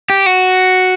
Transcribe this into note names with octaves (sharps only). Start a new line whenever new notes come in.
G4
F#4